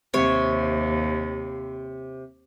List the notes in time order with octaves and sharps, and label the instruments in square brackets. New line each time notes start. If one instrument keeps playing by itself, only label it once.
[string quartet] D#2 [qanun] C3 C#5